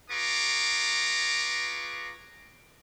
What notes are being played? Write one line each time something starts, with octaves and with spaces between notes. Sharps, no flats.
F4 G#4 B4 A#5 C#6 D6